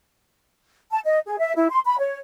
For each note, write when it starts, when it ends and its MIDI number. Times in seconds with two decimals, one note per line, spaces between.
0.92 1.00 81
1.05 1.19 75
1.27 1.37 68
1.40 1.53 76
1.56 1.68 64
1.70 1.80 84
1.85 1.98 83
1.99 2.17 73